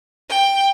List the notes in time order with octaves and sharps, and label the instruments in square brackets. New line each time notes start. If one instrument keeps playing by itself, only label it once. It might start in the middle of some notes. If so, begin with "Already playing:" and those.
[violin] G5